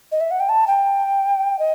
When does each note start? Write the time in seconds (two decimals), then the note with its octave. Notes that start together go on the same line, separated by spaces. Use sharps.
0.12 D#5
0.21 E5
0.31 F#5
0.40 G5
0.49 A5
0.67 G5
1.59 D#5